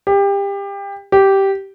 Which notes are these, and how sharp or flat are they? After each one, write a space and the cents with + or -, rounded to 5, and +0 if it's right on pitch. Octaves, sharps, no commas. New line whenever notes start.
G4 +25
G4 -10